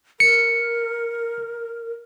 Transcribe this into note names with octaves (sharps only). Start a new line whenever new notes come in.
A#4 C#7